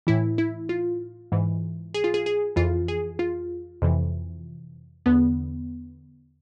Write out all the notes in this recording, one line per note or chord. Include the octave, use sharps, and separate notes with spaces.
A2 E3 E4
E4
F4
G#2 E3
G#4
F4
G#4
G#4
F2 E3 F4
G#4
F4
F2 C3 E3
E2 D3 B3